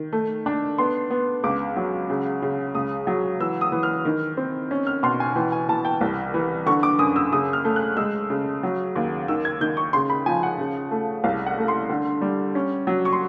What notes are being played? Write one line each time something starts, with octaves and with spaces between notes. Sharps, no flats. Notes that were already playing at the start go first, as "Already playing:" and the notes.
Already playing: D#3
A3
D4
B3 C6
B3
C#2 D6
F#3
C#3
C#3
C#2 D#6
F#3
E3 E6
D#6
E3
F6
D#3
C4
C#4
F6
B2 C6
G#5
E3 G5
G#5
E3 A5
G5
C2
E3
D3 C#6
D6
F#2 D#6
E6
C#3 D#6
F6
A3
F#6
G#3 E6
C#3
F#3
D#2
D#3 E6
G#6
D#3 G6
C#6
C#3 C6
B5
F3 G#5
F#5
C#3
A3
C2 F5
F#5
A3
C6
D3
G3
C#4
F#3
C#6
C6